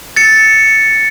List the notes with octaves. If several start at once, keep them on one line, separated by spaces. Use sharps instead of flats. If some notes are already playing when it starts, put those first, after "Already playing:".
A6 C#7